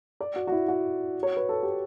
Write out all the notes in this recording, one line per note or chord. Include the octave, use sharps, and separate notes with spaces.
D5
F#4
F#4
E4
F#4
C#5
B4
A4
G4